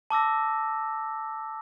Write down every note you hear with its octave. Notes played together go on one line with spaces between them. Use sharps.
A5 D6 E6 A#6